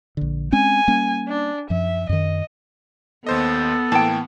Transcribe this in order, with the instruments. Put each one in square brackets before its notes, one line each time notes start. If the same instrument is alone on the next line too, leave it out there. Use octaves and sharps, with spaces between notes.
[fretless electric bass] A#1 D3
[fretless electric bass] G#3 C4 C#4 [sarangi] G#5
[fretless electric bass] G3 A#3 C#4
[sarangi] D4
[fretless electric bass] F#2 F3 [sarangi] E5
[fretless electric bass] F#2 D#3 [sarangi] D#5
[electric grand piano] D#2 C5 D#5 [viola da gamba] B3 [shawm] A4
[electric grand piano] A2 E3 A#3 [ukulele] G5 A5